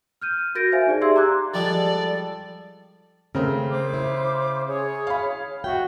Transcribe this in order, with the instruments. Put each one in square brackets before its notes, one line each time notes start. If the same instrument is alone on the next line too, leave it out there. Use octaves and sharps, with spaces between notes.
[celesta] F6 G6 D#7
F#4 A#4 G6 A6 A#6 D7
C5 E5 F5 G#5
D#4 G#4 D5
G4 G#4 E5 C6 E6 G#6
A#5 D6 F#6 G#6
[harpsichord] F3 G3 G#3 [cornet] A4 [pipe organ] D5
[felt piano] C#3 [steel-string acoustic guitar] A3 C4 A#4
[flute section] C5 D6
[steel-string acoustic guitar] E4
[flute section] G#4 C#5
[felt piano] F5 B5
[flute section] F#4 E5 [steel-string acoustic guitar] G5